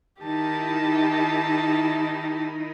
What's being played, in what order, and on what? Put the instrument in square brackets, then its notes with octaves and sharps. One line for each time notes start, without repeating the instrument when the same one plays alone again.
[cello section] D#3 D#4 E4 [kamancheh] G4 A5